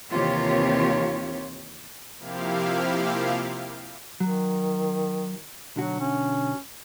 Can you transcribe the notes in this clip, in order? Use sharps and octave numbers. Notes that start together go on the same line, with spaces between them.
D#2 C3 E3 F4 G4 C#5
C3 F3 A#3 E4 G4 F5
D#3 F#3
B1 D3 F#3 F#4
C#4